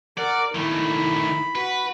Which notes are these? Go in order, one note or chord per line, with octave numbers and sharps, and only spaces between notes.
A#4 D5 F#5
D#3 A3 E4 B5
F#4 B4